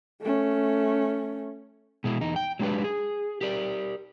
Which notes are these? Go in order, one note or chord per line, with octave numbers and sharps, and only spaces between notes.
A3 C#4
B2 G#3 E4
E2 D#4
G5
F#3 G#3 D4 G4 B4
G#4
G4 A#4 D5